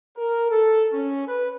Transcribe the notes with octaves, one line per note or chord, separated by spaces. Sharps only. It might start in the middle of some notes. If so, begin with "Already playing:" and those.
A#4
A4
C#4
B4